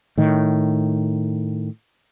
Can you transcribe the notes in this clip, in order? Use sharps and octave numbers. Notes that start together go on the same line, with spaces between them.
A2 D#3